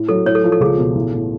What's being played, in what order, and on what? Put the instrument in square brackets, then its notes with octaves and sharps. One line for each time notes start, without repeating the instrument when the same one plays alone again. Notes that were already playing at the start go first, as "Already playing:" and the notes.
Already playing: [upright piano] A2
[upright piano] F#3 [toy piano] A4
[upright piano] A2 [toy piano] C#5
[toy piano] A4
[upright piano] F3
[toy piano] A4
[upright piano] C#2 [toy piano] G#4
[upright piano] B2
A1
A2